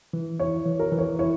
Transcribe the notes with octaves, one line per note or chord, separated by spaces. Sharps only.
E3
E4 C#5
E3
A#4
E3
C#5
E4 C#5